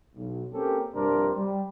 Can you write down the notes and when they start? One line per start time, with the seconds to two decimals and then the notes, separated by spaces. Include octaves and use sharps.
0.15 B1
0.53 A#3 C4 C#4 G4 A4 A#4
0.94 A#1 G2 C3 D4 A#4 C5
1.35 G3